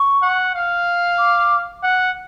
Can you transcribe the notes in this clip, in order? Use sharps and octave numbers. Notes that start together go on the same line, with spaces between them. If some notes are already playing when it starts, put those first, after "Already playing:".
Already playing: C#6
F#5
F5
D6
F#5